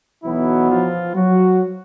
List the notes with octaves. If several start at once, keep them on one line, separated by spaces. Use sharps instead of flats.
B1 B2 E3 F#3 B3 E4
F3 F4
F#3 F#4